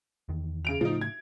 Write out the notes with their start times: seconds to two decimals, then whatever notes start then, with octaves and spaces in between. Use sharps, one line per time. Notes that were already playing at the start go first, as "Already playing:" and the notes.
0.29 E2 D#3
0.65 C#3 D7 F7
0.81 A2 C#3 F3 A3 D#4
1.01 G#6